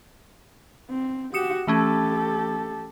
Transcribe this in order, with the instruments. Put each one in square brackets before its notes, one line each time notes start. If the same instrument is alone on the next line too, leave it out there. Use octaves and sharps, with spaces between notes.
[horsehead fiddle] C4
[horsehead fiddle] F#4 G4 [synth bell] D#6 C#7 E7
[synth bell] E3 A3 C#4 [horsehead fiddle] G4 A4